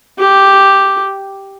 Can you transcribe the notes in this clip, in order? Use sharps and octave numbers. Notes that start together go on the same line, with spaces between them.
G4